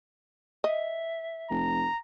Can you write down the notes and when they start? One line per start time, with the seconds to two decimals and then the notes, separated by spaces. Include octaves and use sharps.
0.64 D#5 E5
1.50 F1 A#5